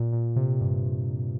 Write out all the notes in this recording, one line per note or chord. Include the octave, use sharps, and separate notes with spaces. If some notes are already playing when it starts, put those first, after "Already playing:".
Already playing: A#2
A#2
C3
G2